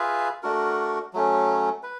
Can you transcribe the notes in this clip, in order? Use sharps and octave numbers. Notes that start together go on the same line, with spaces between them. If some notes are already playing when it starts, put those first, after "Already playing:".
Already playing: F4 G#4 B4 E5
A3 D4 F#4 A#4
F#3 A3 C#4
B4